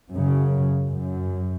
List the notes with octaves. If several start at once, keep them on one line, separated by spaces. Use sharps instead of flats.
F#2 C#3
F#2